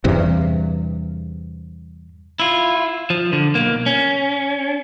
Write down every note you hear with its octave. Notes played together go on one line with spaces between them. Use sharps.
E2 G2 C3
E4 F4
F3
D3
B1 A#3
C#4